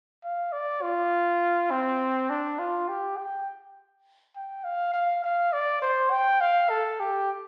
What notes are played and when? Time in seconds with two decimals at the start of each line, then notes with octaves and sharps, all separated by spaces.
0.24 F5
0.52 D5
0.82 F4
1.71 C4
2.30 D4
2.59 F4
2.89 G4
3.18 G5
4.36 G5
4.64 F5
4.93 F5
5.24 F5
5.53 D5
5.82 C5
6.11 G5
6.41 F5
6.70 A4
7.00 G4